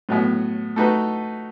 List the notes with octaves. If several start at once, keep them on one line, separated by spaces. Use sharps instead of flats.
A2 F#3 B3
A3 D#4 F#4 B4